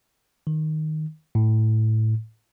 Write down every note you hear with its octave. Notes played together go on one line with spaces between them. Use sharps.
D#3
A2